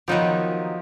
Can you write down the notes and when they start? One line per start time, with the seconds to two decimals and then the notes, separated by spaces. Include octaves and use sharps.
0.08 D#3 F3 F#3 B3 D#4 G4